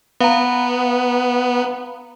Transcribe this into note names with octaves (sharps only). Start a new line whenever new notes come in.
B3 F5 A#5